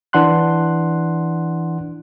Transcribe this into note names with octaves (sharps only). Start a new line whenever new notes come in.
E3 D4 F#5 C6 F#6